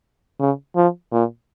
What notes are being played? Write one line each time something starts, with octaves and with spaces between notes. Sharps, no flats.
C#3
F3
A#2